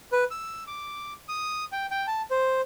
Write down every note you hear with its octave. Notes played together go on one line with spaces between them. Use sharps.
B4
E6
D6
D#6
G5
G5
A5
C5